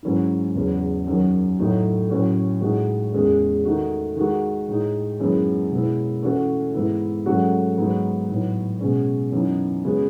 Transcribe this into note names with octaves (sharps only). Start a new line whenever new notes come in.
G#2 F#3 C#4 E4
E2 C#3 F#3 B3
F#2 D#3 F#3
A2 F#3 A3 D#4 F#4
A2 F#3 C#4 F#4
A2 G#3 D#4 F#4
E2 D#3 G#3 C#4
D#3 A3 D#4 F#4
D#3 G#3 D#4 F#4
A2 G#3 D#4
F#2 D#3 G#3 B3 E4
B2 G#3 B3 E4
E3 A3 C#4 F#4
G#2 E3 B3 E4
G#2 F#3 A3 C#4 F#4
G#2 F#3 B3 D#4
A2 F#3 B3 D#4
B2 G#3 C#4
F#2 E3 B3 D#4
C#3 G#3 B3 F#4